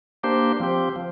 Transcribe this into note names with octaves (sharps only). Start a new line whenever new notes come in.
A#3 D4 G4 C5
F3 C4 G4
F3